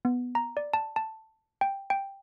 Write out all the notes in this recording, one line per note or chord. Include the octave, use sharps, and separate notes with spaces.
B3
A#5
D5
A5
A5
G5
G5